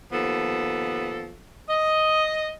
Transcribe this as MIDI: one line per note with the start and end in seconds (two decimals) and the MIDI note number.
0.12 1.35 39
0.12 1.35 53
0.12 1.35 59
0.12 1.35 69
1.69 2.54 75